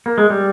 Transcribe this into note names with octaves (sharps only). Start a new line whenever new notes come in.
A#3
G#3
G3